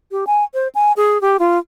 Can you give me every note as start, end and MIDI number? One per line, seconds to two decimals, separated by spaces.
0.12 0.25 67
0.27 0.44 80
0.54 0.68 72
0.75 0.92 80
0.97 1.20 68
1.21 1.37 67
1.39 1.58 65